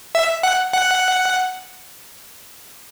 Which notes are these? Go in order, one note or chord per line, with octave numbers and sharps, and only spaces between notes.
E5
F#5
F#5